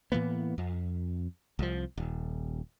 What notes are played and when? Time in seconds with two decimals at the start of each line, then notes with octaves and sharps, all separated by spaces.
0.12 A2 E3 A#3 B3
0.58 F2
1.59 C2 F3
1.97 D#1